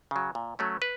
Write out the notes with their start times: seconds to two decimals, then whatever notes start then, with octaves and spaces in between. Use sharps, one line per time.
0.11 C#3 F#3
0.35 A#2
0.59 F#3 A3 C#4
0.82 B4